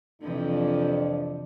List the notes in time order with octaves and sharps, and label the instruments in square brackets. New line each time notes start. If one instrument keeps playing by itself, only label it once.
[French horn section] F2 D4 [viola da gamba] C3 E3 F3